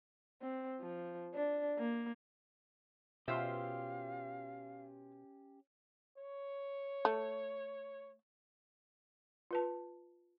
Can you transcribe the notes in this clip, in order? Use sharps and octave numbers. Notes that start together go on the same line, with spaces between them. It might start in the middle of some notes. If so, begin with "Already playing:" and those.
C4
F3
D4
A#3
B2 C#4 F4 G4 C5 E5 F5
C#5
A3
F4 B4 A5